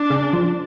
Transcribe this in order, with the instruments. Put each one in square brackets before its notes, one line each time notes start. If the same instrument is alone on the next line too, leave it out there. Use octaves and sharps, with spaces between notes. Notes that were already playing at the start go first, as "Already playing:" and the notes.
Already playing: [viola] D4
[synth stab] C#3
F3